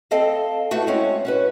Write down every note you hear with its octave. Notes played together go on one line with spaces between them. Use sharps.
C4 A4 D#5 F5 A5
A2 A3 B3 F#4 A4
G#3 C4 C#4 F#4
C#4 F#4 B4